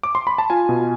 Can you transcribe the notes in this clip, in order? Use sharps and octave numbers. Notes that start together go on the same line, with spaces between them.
D6
C6
B5
A5
F4 G#5
B2